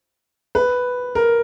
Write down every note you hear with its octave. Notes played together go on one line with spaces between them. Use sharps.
B4
A#4